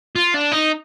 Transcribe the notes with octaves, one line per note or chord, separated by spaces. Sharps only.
F4
D4
D#4